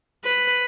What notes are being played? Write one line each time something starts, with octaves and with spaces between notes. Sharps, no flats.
B4